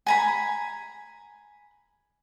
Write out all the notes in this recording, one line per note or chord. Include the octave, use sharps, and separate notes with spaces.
G#5 A#5 B5